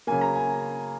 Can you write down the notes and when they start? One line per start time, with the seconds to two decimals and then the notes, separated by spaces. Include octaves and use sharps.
0.07 C#3 F#3 A#3 G#5
0.21 A#5
0.35 G#5